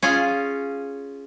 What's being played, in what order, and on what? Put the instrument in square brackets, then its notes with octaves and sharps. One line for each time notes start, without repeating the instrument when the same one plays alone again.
[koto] C#4 F4 G#4 F5